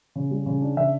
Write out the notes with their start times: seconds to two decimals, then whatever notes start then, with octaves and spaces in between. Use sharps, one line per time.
0.16 C#3
0.31 G3
0.46 C#3
0.61 D4
0.77 C#3 E5